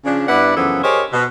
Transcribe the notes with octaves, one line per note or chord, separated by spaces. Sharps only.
C#3 F3 D4
G2 B3 E4 B4 D5 F#5
F#2 C#3 E3 F3 B3 A4
G4 G#4 A#4 C5 C#5 D#5
B2